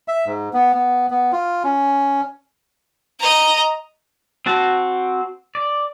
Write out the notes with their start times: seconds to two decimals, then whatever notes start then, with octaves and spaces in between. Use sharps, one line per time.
0.08 E5
0.26 G#2
0.53 B3
0.74 B3
1.11 B3
1.32 F4
1.64 C#4
3.19 D#5 A#5
4.46 C4 F#4 A5
5.55 D5